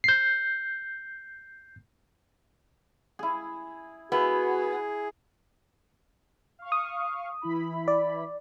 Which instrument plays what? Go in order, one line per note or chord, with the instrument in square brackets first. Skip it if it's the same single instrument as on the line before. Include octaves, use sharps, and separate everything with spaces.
[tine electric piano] G6 C7
[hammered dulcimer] E4 G#4
[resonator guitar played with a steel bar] B3 [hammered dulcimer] E4 [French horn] F#4 [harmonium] G#4
[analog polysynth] F5 C#6
[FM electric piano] D#6
[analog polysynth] E3 E4 B5
[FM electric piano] D5